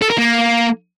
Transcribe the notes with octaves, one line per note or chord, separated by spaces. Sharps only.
A4
A#4
A#3